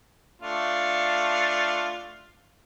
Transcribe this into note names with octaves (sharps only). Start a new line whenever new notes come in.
A3 D4 F4